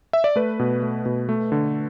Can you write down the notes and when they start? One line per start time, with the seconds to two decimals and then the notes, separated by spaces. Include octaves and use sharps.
0.13 E5
0.24 D5
0.36 A3 B4
0.59 B2
0.82 A3
1.06 B2
1.29 A3
1.52 D3